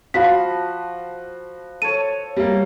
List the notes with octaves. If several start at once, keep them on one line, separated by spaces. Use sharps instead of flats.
F3 F#4 F5 B5 B6
A4 C#5 D#7
G3 A#3